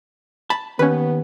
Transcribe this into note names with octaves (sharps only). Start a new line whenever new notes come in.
A5 B5
D#2 B3 C#4 B4